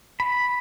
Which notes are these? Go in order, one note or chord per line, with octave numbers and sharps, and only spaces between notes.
B5